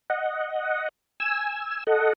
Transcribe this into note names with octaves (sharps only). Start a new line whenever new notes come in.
D#5 F#5
G#5 E6
A4 D#5 F#5